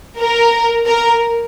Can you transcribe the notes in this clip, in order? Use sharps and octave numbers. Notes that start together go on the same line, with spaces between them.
A#4
A#4